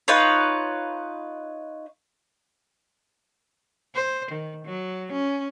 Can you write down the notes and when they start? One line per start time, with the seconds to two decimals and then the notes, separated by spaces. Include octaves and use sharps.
0.08 D#4 F4 B4 C#5
3.95 C5
4.31 D#3
4.65 F#3
5.13 C#4